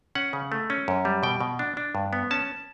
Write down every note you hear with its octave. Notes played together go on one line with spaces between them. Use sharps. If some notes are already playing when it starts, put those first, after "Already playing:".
C#4 F#5
C#3
A3
C#4
F#2
G3
B2 G5
B2
D4
D4
G2
B3
C#4 A5